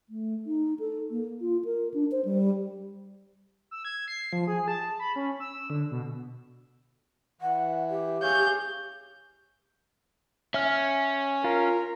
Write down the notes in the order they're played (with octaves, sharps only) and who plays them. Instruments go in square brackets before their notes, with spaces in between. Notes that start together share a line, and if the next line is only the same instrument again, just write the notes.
[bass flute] A3
D#4
A4
A#3
F4
A#4
D4
C5
G3
[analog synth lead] E6
G#6
C7
F3
G#4
A5
B5
C#4
E6
D3
B2
[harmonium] E3 [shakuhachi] F#5
[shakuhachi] G4
[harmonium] G#4 C#5 F5 [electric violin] G6
[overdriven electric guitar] C#4 [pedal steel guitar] E5 F6
[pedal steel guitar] F4 F5 [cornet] A#4